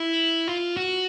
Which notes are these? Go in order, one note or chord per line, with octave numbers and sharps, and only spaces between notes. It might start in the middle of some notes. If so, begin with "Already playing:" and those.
Already playing: E4
F4
F#4